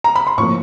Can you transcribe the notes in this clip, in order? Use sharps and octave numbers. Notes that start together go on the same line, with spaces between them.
A#5
B5
C6
A2 F3 A#3 C#6